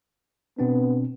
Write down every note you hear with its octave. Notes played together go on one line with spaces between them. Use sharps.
B2 B3 C4 D4